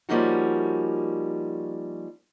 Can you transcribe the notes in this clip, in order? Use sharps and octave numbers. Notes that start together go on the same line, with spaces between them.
F3 G3 A#3 C#4 D#4 F#4